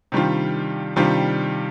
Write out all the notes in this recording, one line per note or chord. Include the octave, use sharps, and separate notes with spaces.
C3 D#3 G3 D4 F4
C3 D#3 G3 D4 F4